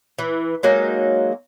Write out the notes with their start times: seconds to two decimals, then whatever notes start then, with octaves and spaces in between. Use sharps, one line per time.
0.18 E3
0.63 F#3 G#3 A#3 D#4